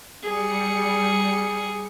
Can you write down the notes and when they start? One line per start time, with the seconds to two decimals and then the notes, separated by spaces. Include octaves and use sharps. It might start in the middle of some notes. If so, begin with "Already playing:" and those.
0.23 G3 G#4 C#7